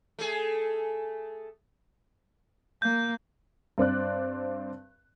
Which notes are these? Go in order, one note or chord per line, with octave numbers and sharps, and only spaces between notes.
A3 G#4
A#3 G6
G2 C4 D5 F#6